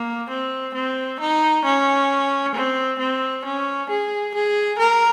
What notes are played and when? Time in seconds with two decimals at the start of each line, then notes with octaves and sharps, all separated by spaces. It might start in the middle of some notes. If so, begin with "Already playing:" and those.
Already playing: A#3
0.29 C4
0.74 C4
1.20 D#4
1.65 C#4
2.55 C4
2.99 C4
3.45 C#4
3.90 G#4
4.35 G#4
4.79 A#4